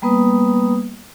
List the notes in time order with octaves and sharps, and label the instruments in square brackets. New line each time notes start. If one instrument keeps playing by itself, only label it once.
[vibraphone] G3 A#3 B3 B4 D#6